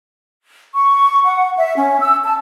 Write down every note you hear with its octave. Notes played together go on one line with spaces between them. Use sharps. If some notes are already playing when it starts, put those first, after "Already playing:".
C#6
F#5
E5
C#4
E6
A5